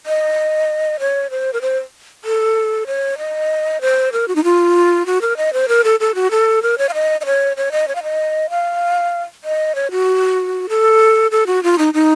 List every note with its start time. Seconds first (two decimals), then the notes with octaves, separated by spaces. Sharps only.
0.06 D#5
1.00 C#5
1.30 C5
1.53 A#4
1.62 C5
2.24 A4
2.87 C#5
3.18 D#5
3.81 C5
4.12 A#4
4.28 F#4
4.36 D#4
4.44 F4
5.06 F#4
5.22 A#4
5.37 D#5
5.53 C5
5.68 A#4
5.84 A4
6.00 A4
6.15 F#4
6.31 A4
6.63 A#4
6.78 C#5
6.89 F5
6.94 D#5
7.21 D#5
7.26 C#5
7.57 C#5
7.72 D#5
7.88 C#5
7.95 F5
8.03 D#5
8.50 F5
9.44 D#5
9.75 C#5
9.91 F#4
10.69 A4
11.31 A4
11.47 F#4
11.63 F4
11.78 D#4
11.94 D#4